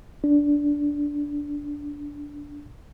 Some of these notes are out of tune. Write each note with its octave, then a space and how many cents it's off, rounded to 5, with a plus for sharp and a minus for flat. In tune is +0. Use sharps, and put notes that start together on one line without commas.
D4 -15